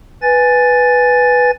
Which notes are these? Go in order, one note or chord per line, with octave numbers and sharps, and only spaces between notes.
B4 G#5 A6